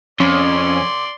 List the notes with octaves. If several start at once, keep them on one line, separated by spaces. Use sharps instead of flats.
F2 C#4 D5 C6